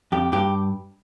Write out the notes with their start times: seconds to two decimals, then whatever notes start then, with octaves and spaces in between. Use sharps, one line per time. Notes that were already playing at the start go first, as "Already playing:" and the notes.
0.12 F2 G4
0.32 G2 G4